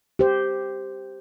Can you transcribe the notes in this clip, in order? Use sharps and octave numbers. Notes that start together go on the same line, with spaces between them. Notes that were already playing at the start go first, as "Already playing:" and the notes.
G4 C5